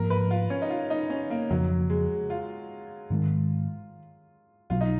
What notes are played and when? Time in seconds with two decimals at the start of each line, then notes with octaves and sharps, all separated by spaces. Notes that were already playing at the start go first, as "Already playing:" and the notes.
Already playing: G#2 F3 A#3 A#4
0.10 B4
0.31 F4
0.50 C#4
0.62 D#4
0.70 F4
0.90 D#4
1.10 C#4
1.30 A#3
1.50 F2 C#3 F3 F#3
1.90 G#3
2.30 F4
3.10 G#2 D#3 G#3
4.70 B1 B2 F#3 F4
4.81 D#4